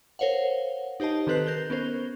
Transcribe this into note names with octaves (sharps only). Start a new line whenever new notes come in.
A#4 C5 C#5 F5 F#5
D#4 G4 C5 D#5 A5
D#3 C4 A4 B4 F#6 C7
A#4 G6 G7
B3 C#4 A#4 C5